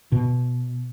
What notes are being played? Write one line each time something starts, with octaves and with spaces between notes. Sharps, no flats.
B2